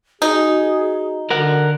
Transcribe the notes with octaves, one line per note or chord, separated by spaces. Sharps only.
D#4 F#4 G#4
D3 A#4 F#5